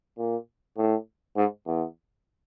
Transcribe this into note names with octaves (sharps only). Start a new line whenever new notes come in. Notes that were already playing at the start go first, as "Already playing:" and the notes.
A#2
A2
G#2
E2